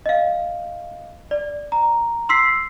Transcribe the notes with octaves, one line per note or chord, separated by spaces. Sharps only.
D#5 F5
D5
A#5
C6 E6 B6 C7